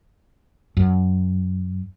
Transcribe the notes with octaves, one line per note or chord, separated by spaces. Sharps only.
F#2